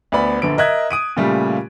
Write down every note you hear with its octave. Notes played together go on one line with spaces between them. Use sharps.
D2 B3 D5 B5
A#1 D3 B4 D7
A#4 D#5 E5 F#6 G#6
D#6 D7 D#7
A#2 C#3 G3 A3 F4